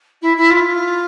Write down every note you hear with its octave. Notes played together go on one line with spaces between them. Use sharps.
E4
E4
F4